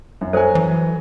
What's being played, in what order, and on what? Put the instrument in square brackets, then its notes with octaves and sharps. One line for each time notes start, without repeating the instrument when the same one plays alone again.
[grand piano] F#2
[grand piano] F#3 G#5 [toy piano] A4 C5
[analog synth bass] E3